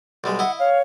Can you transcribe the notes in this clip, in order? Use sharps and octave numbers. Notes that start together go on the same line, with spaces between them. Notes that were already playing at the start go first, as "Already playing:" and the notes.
B1 G3 G#3
E4 D#5 F#5
C#5 F5